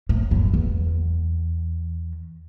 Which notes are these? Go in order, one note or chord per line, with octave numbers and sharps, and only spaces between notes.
A2
F#2
E2